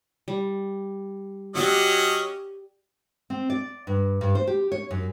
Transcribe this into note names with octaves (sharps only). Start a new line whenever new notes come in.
G3
F#3 C#4 G4 D5 D#5 F#5
C4
D5
G2
G2
C5
G4
C#5
F#2